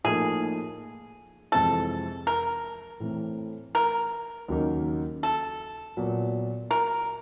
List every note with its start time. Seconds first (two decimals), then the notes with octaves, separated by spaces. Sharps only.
0.04 A2 F3 A#3 D#4 G#4
1.52 F2 C3 E3 G#3 C4 A4
2.27 A#4
3.00 A2 E3 A3 C4
3.75 A#4
4.48 D#2 C#3 F#3 A#3 D#4
5.23 A4
5.97 A#2 F#3 B3
6.71 A#4